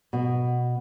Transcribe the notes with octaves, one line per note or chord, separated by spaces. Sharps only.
B2